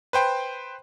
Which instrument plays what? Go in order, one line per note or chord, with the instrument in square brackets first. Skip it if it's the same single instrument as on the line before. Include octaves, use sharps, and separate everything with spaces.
[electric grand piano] B4 C5 G5 C6